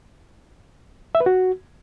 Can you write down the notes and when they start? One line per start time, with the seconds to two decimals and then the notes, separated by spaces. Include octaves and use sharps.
1.15 E5
1.20 B4
1.26 F#4